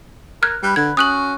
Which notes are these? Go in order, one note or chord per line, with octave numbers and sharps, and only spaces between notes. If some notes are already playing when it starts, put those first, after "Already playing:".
A#4 F6 F#6 G#6
G3 B4
D3 B4 G#6
C#4 F#4 D#6 F#6 F#7